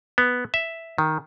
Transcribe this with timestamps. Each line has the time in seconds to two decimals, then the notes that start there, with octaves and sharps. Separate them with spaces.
0.18 B3
0.54 E5
0.98 D#3